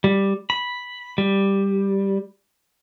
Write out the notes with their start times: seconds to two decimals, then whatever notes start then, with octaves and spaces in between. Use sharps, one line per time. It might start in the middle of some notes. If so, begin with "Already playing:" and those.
0.04 G3
0.50 B5
1.18 G3